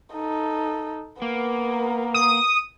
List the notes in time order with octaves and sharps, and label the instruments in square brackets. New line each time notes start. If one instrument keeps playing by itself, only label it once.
[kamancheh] D#4 A4
[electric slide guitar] A#3 [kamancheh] B3 A#4
[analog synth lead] D#6